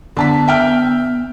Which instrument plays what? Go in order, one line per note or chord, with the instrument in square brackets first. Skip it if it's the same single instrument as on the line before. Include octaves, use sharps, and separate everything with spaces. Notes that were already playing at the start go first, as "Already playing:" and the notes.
[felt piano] D3 A5 B6 [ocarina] B3
[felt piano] E5 G5 F6